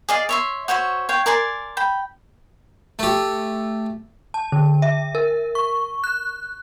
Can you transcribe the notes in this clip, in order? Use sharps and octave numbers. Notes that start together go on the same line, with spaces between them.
G#4 D5 D#5 F5
C#5 E5 C6
F#4 C5 C#5 E5
C#5 F5 G5
A#4 D5 G#5 C6
G5 B5
A3 G4
A5
D3
E5
A#4
C#6
F#6